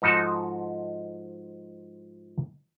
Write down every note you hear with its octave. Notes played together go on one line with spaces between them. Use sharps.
G#2 F3 D#4 F#4 A4